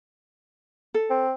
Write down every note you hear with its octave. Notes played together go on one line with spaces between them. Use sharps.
A4
C4